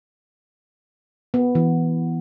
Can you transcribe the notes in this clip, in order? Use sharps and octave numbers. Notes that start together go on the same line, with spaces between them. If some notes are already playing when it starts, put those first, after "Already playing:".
B3
E3